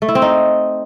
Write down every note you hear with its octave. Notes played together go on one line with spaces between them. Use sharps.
A3
E4
C4
D#4